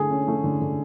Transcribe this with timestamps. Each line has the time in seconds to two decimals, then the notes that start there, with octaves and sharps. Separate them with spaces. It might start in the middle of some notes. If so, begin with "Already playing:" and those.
Already playing: D3 A3 G#4
0.11 C#4
0.28 A3
0.44 D3
0.61 D3